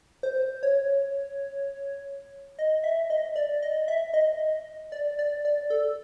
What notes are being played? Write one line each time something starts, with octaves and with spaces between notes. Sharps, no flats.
C5
C#5
D#5
E5
D#5
D5
D#5
E5
D#5
D5
D5
D5
A4